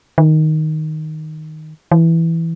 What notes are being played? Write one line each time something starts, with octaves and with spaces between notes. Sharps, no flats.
D#3
E3